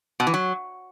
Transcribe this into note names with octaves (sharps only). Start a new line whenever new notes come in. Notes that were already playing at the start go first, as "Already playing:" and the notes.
B2
E3
F#3